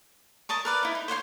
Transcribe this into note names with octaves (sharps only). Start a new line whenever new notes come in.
A#4 D#5 A5 C#6
A#4 B4 D5
D#4 E4
D#4
C5 C#5 F#5 C6